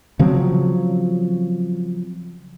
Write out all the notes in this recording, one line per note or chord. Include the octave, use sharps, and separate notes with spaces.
C#3 F3 F#3 C4